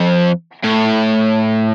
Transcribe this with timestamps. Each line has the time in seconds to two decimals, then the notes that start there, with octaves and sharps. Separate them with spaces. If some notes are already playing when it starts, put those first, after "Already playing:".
Already playing: F2
0.64 A2